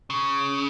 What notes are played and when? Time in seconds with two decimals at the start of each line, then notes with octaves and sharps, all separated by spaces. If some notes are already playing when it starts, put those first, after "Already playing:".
0.10 C#3